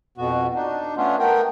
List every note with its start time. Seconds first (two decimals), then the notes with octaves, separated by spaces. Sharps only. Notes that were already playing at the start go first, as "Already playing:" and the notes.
0.18 F2 B2 B3 F#4
0.55 D4 D#4
0.97 A3 B3 C#4 D4 F4
1.19 A3 B3 A#4 G5